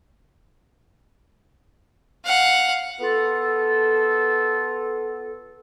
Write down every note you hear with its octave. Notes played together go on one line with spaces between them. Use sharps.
F5 F#5
B3 F4 A4